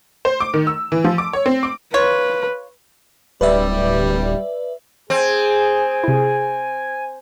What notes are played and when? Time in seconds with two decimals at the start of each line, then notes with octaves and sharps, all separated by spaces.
0.25 C5
0.40 D6
0.54 D#3
0.67 E6
0.92 E3
1.04 F3
1.18 D6
1.33 C#5
1.46 C4
1.63 D6
1.94 F4 B4 C#5
3.41 D1 G3 B4 D5 E5
5.10 C4 G#4 G#5
6.04 C3 E4